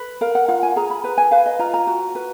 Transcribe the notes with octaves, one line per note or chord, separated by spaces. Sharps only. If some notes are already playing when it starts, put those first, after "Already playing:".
Already playing: B4
A#4 F5
F#5
F4 F#5
G#5
G#4 A#5
B5
B4 A#5
G#5
B4 F5
D#5
F4 A#5
A#5
F#4
B4